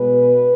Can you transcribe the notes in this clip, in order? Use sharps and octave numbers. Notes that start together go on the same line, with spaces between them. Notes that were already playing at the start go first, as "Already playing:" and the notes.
Already playing: B2 G#3 B3 B4